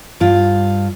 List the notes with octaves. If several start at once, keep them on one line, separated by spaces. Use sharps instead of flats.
G2 F4